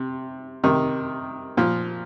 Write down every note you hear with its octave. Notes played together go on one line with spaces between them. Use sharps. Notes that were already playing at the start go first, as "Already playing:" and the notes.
Already playing: C3
C3 D#3
A#2 F3